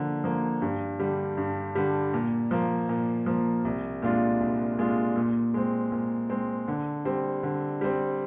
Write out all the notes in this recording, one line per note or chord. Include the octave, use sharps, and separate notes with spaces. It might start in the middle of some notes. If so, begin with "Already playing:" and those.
Already playing: D3 F3 A#3
F3 A#3
G2
D3 G3
G2
D3 G3
A#2
F3 A#3
A#2
F3 A#3
C2
A#2 G#3 D4 F4
C2
A#2 G#3 D4 F4
A#2
G#3 C4
A#2
G#3 C4
D3
G3 C4
D3
G3 C4